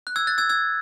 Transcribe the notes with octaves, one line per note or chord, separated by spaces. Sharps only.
F#6
E6 G#6
F#6 A6
E6 G#6
E6 G#6